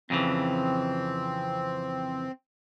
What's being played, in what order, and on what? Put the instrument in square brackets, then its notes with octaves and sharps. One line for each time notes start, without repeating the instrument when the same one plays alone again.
[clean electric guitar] F2 C#3 E3 [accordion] C4